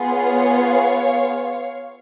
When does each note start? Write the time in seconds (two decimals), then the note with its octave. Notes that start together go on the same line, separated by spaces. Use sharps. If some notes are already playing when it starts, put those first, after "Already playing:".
Already playing: B3 F4 G#4
0.11 C#5 F5